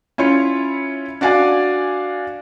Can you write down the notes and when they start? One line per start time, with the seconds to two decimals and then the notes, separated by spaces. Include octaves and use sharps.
0.18 C#4 E4 F4 C#5
1.21 D4 F#4 D5 F5 G#5